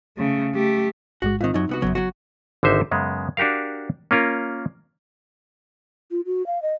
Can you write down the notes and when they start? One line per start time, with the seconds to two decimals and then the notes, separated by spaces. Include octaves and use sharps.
0.17 C#3 A3
0.54 A3 G4
1.22 A1 G#2 G#3 F#4
1.41 G#2 D#3 C4 F4
1.54 F#2 F#3 D#4
1.69 C2 B3 F#4
1.82 G#1 F#2 C#3 F#3 B3
1.95 F#3 F#4
2.63 G#1 D3 D#4 C5 E5
2.91 F#2 C#3 G#3 B3
3.37 D4 F#4 G4 A#4 F5
4.11 A#3 C#4 F4 A#4
6.11 F4
6.26 F#4
6.47 F5
6.62 D#5